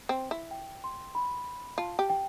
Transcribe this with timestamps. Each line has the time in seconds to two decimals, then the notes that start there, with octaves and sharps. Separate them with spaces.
0.09 C4
0.31 E4
0.51 G5
0.84 C6
1.15 B5
1.78 F4 A5
1.99 G4
2.10 G5